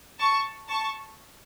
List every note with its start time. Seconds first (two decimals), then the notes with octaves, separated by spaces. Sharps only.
0.20 A5 C#6
0.69 A5 C#6